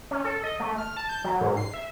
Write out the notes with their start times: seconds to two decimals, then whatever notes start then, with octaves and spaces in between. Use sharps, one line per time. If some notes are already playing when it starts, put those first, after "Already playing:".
0.11 C#4
0.24 A4
0.44 D#5
0.60 A3
0.78 F6
0.97 A5
1.09 G6
1.24 F#3
1.41 G#2
1.57 C7
1.74 E5